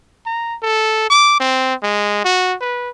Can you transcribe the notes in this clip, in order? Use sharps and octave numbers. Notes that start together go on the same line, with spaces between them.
A#5
A4
D6
C4
G#3
F#4
B4